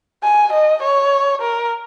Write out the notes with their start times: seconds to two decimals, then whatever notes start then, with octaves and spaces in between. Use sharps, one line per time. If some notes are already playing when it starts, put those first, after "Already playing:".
0.23 G#5
0.52 D#5
0.82 C#5
1.41 A#4